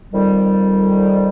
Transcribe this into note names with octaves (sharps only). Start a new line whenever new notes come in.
F2 D#3 G3